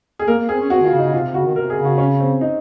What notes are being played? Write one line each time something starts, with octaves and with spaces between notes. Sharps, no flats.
G#4
A#3 A#4
A#3
C4 G#4
C#4
C4 F#4
D#3 F4
C#3
D#4
C#3
C3 F4
C3
C#3 F#4
D#3
C3 A#4
G#4
C#3
F#4
C#4
C4
D#4